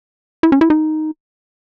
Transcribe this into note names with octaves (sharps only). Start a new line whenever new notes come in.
E4
C#4
E4
D#4